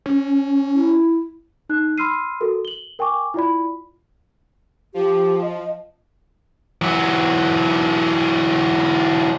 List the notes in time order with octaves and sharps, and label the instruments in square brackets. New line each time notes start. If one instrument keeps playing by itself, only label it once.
[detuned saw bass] C#4
[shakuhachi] E4
[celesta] D#4 F#6
B5 C6 E6 F6 C7 D#7
F#4 A4 A#4
F#7 G7
A#4 G5 G#5 C#6 D6
E4 F4 D5 B5
[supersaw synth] F3 [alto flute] G4
[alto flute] D#5
[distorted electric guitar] E3 F#3